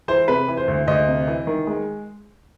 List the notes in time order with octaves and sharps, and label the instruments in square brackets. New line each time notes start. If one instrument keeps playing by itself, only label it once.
[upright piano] E3 C5
C3 B4
E3
C5
D2
D2 D#5
C3
E3
D#3
G#3